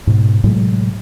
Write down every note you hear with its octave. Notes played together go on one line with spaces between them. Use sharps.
G#2 B2
A2 C3 F#3 G#3